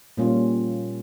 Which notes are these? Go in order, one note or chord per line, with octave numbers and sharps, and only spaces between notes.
A#2 G3 A#3 C#4 F4